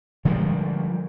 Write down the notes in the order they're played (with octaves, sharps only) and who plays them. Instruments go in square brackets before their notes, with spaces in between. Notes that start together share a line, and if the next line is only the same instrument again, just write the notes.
[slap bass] D3 F3 G3 G#3